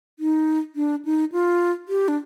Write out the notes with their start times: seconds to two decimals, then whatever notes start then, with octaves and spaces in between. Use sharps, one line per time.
0.19 D#4
0.76 D4
1.05 D#4
1.32 F4
1.89 G4
2.08 D4